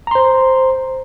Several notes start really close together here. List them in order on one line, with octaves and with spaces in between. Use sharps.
A#5 C6 C5